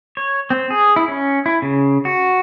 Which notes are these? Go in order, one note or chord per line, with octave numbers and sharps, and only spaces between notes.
C#5
C4
G#4
E4
C#4
E4
C#3
F#4